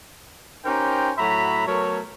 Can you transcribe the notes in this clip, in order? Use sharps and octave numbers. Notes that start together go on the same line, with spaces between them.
C#4 D#4 G4 A#4 C5 G5
A2 F#3 F#4 E5 A#5 B5
F#3 A3 B3 A4 A#4 C#5